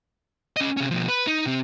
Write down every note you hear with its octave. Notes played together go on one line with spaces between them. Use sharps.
C#4 D#5
C3 C#4
B2 F3
B4
D#4
C3 C4